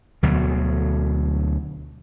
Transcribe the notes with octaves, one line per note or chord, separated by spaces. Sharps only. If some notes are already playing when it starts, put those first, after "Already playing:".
D2 B2 F#3